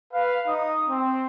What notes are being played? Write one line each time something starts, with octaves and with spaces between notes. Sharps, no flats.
B4 F5
D#4 D#6
C4